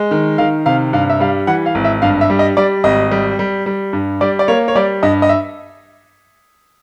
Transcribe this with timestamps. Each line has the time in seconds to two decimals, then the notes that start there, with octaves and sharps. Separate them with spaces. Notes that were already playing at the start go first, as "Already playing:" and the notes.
Already playing: G#3
0.11 D#3
0.38 D#3 F5
0.66 C3 F5
0.93 G2 F5
1.10 E5
1.20 G3 F5
1.47 E3 F#5
1.66 F5
1.75 G#1
1.85 E5
2.02 G2 F5
2.21 E5
2.30 G3
2.39 D#5
2.57 G3 D5
2.84 G#1 D#5
3.11 G3
3.39 G3
3.66 G3
3.93 G2
4.21 G3 D5
4.39 D5
4.48 A#3 C#5
4.68 C#5
4.75 G3 D5
5.03 G2 D#5
5.22 D#5
5.29 E5